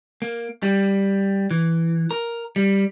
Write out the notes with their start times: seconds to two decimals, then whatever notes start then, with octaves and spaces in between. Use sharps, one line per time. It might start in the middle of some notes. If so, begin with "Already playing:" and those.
0.22 A#3
0.63 G3
1.51 E3
2.11 A#4
2.56 G3